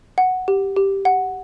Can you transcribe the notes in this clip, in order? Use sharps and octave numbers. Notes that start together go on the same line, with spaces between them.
F#5
G4
G4
F#5